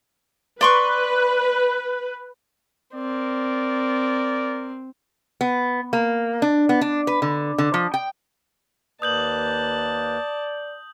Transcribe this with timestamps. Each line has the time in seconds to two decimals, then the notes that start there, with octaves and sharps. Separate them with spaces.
0.61 B4 D5 C6 C#6
2.95 C4 A#4 D5
5.41 B3
5.93 A#3
6.42 D4
6.69 B3
6.81 D4
7.07 B4
7.22 D3
7.58 D3
7.74 F3
7.94 G5
9.02 D#2 A#3 B4 D5 A5 D#6 G6 F#7